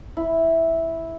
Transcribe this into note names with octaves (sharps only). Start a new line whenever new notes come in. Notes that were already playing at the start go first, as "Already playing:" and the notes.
E4